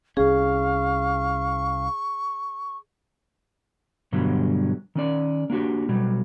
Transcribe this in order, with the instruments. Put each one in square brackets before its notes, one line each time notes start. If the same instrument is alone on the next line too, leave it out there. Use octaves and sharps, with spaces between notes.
[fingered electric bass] C2 C#4 [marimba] G#4 [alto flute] F5 [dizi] C#6
[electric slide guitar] G2 B2 D3 F#3 G3
D#3 C#4 D5
A#3 D4 F#4 G4
B2 F#3 G3